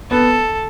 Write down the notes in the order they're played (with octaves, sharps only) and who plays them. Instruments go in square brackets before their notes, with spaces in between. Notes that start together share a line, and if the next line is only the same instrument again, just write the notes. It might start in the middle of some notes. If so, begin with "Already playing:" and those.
[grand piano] B3 [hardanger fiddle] A4